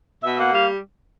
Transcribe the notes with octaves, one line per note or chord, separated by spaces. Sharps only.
B2 E5
A#3 F#5
G3 F5